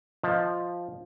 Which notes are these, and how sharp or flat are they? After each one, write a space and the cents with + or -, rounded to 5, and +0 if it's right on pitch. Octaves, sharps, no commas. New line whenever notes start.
F3 +0 D#5 +0